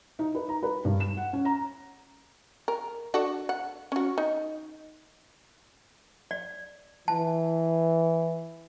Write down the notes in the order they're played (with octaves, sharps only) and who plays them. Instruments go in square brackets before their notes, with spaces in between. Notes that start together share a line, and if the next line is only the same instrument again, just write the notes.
[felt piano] D#4
B4
A#5
B4
G2
E7
F#5
C#4
A#5
[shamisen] A#4
D4 F#4 A4
F#5
C#4 F#4
D#4
[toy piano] D5
[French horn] E3 [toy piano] A5